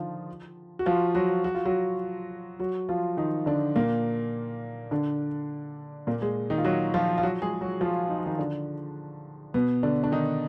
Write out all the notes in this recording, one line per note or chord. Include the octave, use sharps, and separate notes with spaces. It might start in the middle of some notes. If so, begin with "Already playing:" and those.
Already playing: D3 D#3 F3 D#4 F4
F#4
F3 F4
F#3 F#4
F#4
F4
F#3 F#4
F#3 F#4
F3 F4
D#3 D#4
D3 D4
A#2 A#3
D3 D4
A#2 A#3
G#3
D#3 D#4
F4
F#3 F#4
F3 F4
F4
F#3 F#4
G#3 G#4
F#3 F#4
F3 F4
D#4
F4
D#3 D#4
D3 D4
B2 B3
D3 D4
D4
D#3 D#4